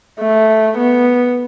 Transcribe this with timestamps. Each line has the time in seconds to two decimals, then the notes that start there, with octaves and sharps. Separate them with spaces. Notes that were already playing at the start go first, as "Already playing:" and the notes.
0.20 A3
0.78 B3